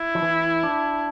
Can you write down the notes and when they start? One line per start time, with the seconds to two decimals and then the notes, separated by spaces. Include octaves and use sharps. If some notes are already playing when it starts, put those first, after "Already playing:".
Already playing: E4
0.15 F3
0.22 E3
0.63 D4